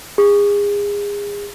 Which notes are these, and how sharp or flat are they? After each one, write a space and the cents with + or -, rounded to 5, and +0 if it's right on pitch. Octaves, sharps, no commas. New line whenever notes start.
G#4 -30